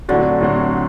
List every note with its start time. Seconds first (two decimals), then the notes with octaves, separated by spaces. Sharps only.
0.09 A2 D3 F#3 C4 F#4
0.41 A2 F#3 C4 F#4